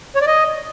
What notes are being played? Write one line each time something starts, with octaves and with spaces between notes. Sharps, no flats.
C#5
D5
D#5